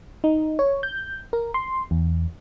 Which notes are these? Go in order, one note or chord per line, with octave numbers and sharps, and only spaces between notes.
D#4
C#5
G6
A#4
C6
E2